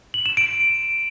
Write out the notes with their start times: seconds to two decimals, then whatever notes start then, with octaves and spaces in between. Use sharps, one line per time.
0.14 F#7
0.26 E7
0.37 D7